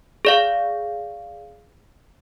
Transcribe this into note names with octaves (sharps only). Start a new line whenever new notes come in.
G#4 D5 F5